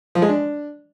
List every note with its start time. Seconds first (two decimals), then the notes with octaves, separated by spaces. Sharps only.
0.15 F3
0.22 G#3
0.29 D4